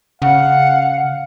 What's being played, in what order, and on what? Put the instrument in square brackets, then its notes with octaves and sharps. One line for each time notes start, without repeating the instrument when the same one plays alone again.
[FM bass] C#3 [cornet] F5 [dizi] F#5